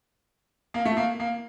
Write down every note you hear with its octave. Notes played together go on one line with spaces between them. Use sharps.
A#3
A3
A#3
A#3